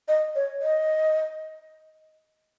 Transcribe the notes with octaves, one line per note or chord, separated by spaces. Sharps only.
D#5
C#5
D#5